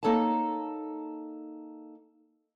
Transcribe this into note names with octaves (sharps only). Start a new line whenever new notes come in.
A#3 D#4 A4 C#5 D5 A5